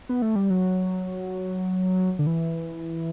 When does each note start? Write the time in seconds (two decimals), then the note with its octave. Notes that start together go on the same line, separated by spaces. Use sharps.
0.09 B3
0.22 A3
0.36 G3
0.50 F#3
2.19 D3
2.27 E3